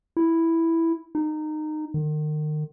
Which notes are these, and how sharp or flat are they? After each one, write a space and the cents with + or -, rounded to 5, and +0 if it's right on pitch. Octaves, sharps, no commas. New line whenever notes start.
E4 +0
D#4 -20
D#3 -35